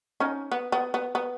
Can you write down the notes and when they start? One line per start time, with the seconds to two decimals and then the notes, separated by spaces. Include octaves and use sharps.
0.20 C#4 D#4
0.52 B3
0.72 B3
0.94 B3
1.15 B3